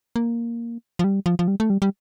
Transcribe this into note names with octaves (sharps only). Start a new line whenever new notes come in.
A#3
F3
G3
F3
F3
G3
A3
G3
G3